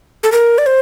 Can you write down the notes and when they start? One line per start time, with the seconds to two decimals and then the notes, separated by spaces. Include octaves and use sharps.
0.23 A4
0.32 A#4
0.58 D5
0.66 C5